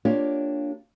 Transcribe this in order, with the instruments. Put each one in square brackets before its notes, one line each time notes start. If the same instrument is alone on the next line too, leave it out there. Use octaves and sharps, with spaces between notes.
[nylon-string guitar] A#3 D4 F4 G4 C#5 D5